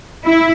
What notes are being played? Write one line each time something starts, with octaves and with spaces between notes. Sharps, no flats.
E4